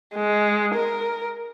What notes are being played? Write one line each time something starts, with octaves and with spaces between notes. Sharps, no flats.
G#3
A#4